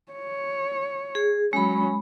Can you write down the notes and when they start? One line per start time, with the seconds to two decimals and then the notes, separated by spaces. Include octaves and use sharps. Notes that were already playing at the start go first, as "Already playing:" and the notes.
0.12 C#5
1.15 G#4
1.53 F#3 G#3 C#4 B5